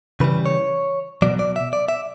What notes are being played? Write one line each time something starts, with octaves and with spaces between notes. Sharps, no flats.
C#3 E3 G3 B4
C#5
B2 F#3 D5
D5
E5
D5
E5